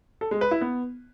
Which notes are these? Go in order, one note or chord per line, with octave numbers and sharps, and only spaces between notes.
A4
G#3
B4
E4
B3